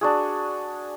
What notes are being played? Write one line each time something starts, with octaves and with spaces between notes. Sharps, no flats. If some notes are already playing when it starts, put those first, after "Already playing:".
D4 F#4 G#4